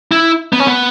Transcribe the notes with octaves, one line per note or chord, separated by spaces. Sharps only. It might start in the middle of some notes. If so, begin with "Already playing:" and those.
E4
B3
C#4
B3